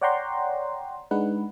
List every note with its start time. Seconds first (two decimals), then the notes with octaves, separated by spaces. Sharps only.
0.01 C#5 D5 F#5 G5 A#5 C6
1.11 G#3 D4 D#4 B4 F#5